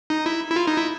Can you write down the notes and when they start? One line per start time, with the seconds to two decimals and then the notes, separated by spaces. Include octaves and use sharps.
0.10 D#4
0.26 E4
0.50 E4
0.56 F4
0.67 D#4
0.77 E4